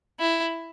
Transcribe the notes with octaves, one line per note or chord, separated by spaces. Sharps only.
E4